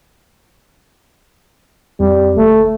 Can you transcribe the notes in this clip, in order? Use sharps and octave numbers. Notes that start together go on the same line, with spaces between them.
F2 G3
G1 A3